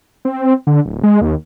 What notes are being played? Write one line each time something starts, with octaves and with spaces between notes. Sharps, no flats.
C4
D3
D1
G#3
D#2